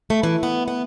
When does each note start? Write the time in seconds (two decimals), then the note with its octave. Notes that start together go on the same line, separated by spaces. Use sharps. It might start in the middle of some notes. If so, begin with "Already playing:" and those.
0.10 A3
0.23 E3
0.43 B3
0.68 B3